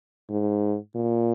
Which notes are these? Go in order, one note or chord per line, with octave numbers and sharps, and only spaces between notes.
G#2
A#2